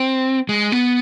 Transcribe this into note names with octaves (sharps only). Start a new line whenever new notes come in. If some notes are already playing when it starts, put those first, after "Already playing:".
Already playing: C4
G#3
B3